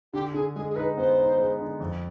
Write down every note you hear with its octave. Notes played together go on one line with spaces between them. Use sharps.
D3 G4
D3 G#4
G#3 G#4
G#4
D#4 B4
B3 C5
D#4
G#3
D3
F2